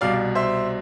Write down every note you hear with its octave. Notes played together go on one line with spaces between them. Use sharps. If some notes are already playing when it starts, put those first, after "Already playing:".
C2 B2 D5 F5
C5 E5